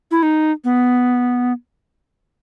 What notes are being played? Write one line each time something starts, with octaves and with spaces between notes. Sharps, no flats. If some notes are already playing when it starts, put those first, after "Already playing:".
E4
D#4
B3